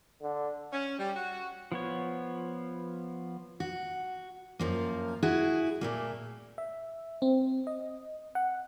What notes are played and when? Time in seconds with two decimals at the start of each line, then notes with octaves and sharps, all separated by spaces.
0.22 D3
0.72 C#4
0.99 G3
1.16 F#4
1.72 F3 B3 C#5
3.60 F#4
4.59 F#2 F3 A#3
5.23 E4 F#4 G#4
5.81 A#2 A3 A#3
6.58 E5
7.22 C4
7.67 D#5
8.35 F#5